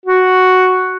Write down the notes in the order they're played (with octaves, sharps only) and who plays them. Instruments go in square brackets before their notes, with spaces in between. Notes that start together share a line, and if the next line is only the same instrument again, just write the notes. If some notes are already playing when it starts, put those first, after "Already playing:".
[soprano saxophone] F#4